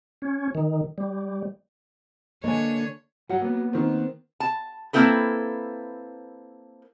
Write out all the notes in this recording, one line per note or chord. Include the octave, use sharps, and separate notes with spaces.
C#4
D#3
G3
D3 A#3 D4 B4 C#5 D#5 G#5
G2 F#3 F#5
A#3 B3
D#3 C4
A5
A#3 C4 E4 A4 B4